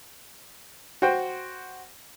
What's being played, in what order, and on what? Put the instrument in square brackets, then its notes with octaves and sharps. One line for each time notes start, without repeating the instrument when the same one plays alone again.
[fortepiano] F#4 C5 G5